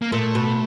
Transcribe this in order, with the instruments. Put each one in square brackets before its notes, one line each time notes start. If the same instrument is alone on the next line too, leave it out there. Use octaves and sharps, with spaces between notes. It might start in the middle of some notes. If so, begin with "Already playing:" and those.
[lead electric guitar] A#3
[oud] A#2 [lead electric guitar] A3
[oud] B2